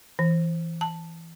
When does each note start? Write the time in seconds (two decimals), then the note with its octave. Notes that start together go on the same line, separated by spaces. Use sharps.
0.19 E3
0.81 A5